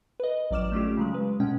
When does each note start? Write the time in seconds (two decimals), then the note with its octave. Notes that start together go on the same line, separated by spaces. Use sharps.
0.20 B4 D#5
0.51 A1 F#3 D5 D6 F6 E7
0.72 A3 C#4 F4 G4
0.97 C#3 F#3 G#3
1.14 B4
1.40 B2 G#3 C#4 G5